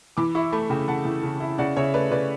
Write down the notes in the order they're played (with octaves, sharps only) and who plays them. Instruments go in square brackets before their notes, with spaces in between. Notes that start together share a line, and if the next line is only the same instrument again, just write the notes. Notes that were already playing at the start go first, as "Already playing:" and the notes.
[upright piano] E3 [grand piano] B5 D6
[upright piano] E4 [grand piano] C#6 E6
[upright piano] A3 [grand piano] B5 D6
[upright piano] C#3 [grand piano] G5 B5
[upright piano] E3 [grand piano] F#5 A5
[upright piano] E3
C#3
E4
[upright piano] C#3 [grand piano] D5 F#5
[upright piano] C#3 [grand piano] C#5 E5
[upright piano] A3 [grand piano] B4 D5
[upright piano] C#3 [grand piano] B4 D5